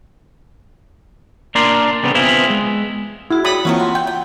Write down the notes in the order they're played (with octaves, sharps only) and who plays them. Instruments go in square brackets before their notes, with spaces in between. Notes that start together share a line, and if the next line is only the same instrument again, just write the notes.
[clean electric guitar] A#3 D4 A#4 D5 C6
C#3 G3 B3 C4
B3 C4 E4 F4 G#4 E5
G#3
[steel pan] E4 [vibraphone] F#4 G#4
[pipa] G3 [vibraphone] C#5 [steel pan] B5 D#6
[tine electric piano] E3 A#3 C4 [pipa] F#3 A3 F#4 [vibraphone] F4 G5
[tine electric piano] F#5 [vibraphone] C6
[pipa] G5
G5